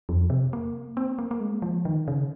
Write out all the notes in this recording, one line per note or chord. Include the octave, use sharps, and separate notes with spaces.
F2
C3
A#3
C4
A#3
A#3
G#3
F3
D#3
C#3